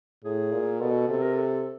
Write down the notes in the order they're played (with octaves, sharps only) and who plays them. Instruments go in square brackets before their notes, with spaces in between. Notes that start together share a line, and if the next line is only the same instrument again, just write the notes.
[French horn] A2 [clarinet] G#4
[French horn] A#2
[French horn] B2 [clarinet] A4
[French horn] C3 [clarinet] A4
[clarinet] A#4
A4